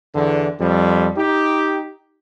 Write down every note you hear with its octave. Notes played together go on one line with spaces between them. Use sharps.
E2 D3
F2 G3
D#4 G4